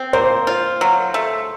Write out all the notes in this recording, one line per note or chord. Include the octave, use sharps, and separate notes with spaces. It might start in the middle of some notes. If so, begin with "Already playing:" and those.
Already playing: C4
A#3 C5
F4
F#3
A3